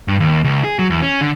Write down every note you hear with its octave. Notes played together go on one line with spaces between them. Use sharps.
G2
D#2
C#2
G#4
F#3
E2
C#4
D3